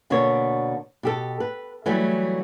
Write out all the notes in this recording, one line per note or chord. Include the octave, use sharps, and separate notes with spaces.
D2 B2 D3 A#3 D4 C#5
B2 G4 A4
B4
E3 F#3 G3 A3